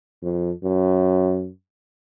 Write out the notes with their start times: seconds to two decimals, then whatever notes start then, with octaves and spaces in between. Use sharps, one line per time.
0.23 F2
0.63 F#2